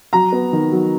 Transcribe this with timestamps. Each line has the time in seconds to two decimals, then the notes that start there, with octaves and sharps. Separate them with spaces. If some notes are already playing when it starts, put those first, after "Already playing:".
0.13 F#3 A#5
0.32 B3
0.53 D#3
0.72 F#3